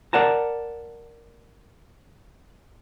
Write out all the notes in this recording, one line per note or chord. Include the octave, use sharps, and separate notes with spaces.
A#4 D5 F#5 A5 A#5